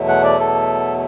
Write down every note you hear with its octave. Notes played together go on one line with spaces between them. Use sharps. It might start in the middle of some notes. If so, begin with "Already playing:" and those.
Already playing: E2 B2 F#3 A3
F#5
D5
A4